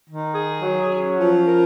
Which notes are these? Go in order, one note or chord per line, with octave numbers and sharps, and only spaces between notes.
D#3
G#4
F#3
C#4
F3
A#4